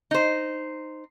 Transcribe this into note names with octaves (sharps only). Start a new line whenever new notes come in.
D#4 C5